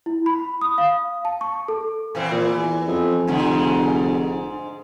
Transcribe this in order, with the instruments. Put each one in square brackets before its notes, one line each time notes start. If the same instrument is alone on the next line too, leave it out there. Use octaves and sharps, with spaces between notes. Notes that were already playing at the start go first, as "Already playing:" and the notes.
[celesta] E4
B5
D#6
F5
A5
C#6
A4
[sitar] A#2 E3 C4
[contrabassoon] A#2 [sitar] E3
[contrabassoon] E2
F2
[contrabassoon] F1 [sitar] G#2 D3 G#3